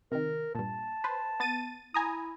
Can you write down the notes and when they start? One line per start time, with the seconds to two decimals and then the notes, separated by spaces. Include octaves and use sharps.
0.12 C3 D#3 A#4
0.55 G2 A#2 A5
1.04 B4 C5
1.40 B3 A6 D#7
1.94 E4 G#5 A#5 D#6